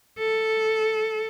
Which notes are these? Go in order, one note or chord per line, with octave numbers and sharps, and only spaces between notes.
A4